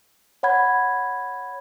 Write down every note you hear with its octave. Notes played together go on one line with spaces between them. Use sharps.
C#5 F#5 B5 G#6